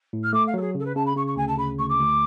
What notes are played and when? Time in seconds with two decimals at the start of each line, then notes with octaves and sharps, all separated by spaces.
0.13 A2
0.23 F6
0.33 A3 D6
0.47 F5
0.54 F#3 A4
0.61 G#4
0.75 C#3 A4
0.85 B4
0.95 C#3 A5
1.06 B5
1.16 C#3 C#6
1.27 C#6
1.36 D2 G#5
1.47 A5
1.57 C#3 B5
1.78 D2 C#6
1.89 D6
1.98 D2